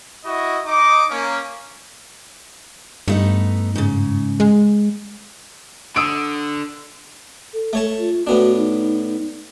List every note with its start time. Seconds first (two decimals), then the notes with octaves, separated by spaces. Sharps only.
0.24 E4 F#4 D#5
0.66 D#4 D#5 D6
1.10 A#3 C#4
3.08 G2 A3 B3 D#4
3.75 G#2 C#3
4.40 G#3
5.96 D3 D#6 E6 D7
7.54 A4
7.73 A3 C#5 A5
7.99 F4
8.27 A2 B3 D4 F#4
8.57 D#4